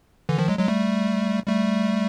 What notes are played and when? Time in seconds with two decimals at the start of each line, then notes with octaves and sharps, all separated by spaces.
0.29 D3 E3
0.38 D#3 F3
0.48 F#3 G#3
0.58 F#3 G#3
0.68 G3 A3
1.47 G3 A3